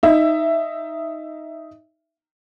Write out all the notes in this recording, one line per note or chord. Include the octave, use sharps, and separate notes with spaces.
D#4 E5